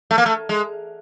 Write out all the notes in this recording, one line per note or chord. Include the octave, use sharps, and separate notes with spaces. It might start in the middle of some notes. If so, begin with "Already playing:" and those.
A3
A#3
A3
G#3